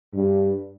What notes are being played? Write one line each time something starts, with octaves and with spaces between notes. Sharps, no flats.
G2